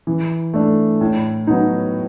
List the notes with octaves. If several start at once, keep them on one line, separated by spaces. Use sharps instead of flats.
E3
A3 D4
A2
F#3 B3 D#4